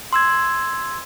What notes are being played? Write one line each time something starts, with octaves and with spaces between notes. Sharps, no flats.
C6 E6 G#6